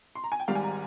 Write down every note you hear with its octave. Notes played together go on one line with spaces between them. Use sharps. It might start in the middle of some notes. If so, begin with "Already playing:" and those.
C6
A#5
G#5
G5
G#1 G#2 G3 F5
G#5
A#5